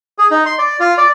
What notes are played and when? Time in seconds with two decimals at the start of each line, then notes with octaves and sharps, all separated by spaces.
0.18 G#4
0.31 D#4
0.46 C6
0.59 D5
0.80 F4
0.98 D5